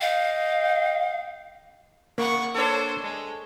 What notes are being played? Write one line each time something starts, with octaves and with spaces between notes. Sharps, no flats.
D#5 F5 G5
C3 A#3 F#5 C#6
D4 A4 C5 C#5
G#3